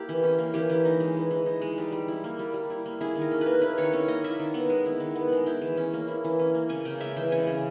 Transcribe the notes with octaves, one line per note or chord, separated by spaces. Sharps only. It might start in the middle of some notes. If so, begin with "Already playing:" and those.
Already playing: A#3 E4 G4
E3
C#4
A#3
E3 G4
E3
D#4
G#3
E3
E3
D#4
G#3
G3
G3
E4
A#3
G3
G3
E4
A#3
E4 G#4
D#3
A#4
C#4
B4
A#3
E4 B4
D#3 C#5
C#4 C#5
A#3 D#5
E4 E5
D#3
B3
G#3
E4
D#3
B3
G#3
E4 G5
E3
C#4
A#3
E4
E3
C#4
A#3
C#3 G#5
C#3 G5
G#3 E5
E3 G5
C#3 G#5
C#3